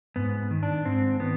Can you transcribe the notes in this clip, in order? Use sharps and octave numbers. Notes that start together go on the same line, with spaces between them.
G#2 B3
D#3
D4
G#2 C4
D#3 B3